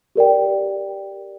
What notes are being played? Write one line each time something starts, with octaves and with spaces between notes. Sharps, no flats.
G4 A#4 D5 G5